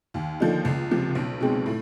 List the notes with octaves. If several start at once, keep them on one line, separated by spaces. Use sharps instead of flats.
D#2
D3 F3 A#3 D#4
C#2
C3 F3
B1
B2 G#3 C4
A2